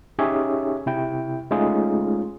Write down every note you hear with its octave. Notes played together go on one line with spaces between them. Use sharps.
C#4 D#4 G4 G#4 C#5 E5
C3 E4 G5
G#3 A3 C#4 D#4 F4 G#4